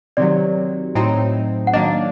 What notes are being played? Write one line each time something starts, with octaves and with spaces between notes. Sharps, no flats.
C3 D#3 F#3 D5
A2 F#3 C4 D#4
F#5
D#3 F#3 A#3 D4 D#5